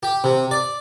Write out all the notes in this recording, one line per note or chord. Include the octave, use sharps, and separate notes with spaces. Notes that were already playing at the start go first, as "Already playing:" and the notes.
G4
C3
D5